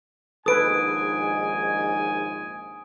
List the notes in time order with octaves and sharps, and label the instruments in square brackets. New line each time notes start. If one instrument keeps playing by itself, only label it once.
[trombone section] A#1 D#2 G#2 [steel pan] A4 B4 [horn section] G#5 [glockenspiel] D#6 D7